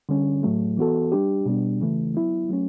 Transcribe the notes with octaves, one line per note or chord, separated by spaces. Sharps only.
D3 G3 C#4
A2 F#3 A3
E3 B3 F#4 A4
G3 D4 G4
B2 G3 B3 D4
C#3 E3 A3
F#3 B3 E4
F#3 A3 C#4